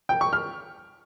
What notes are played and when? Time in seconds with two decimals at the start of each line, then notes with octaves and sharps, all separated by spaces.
0.09 G5
0.21 C#6
0.33 F6